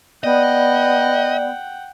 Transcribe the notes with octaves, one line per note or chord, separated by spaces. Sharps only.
B3 D5 D#5 F#5 G5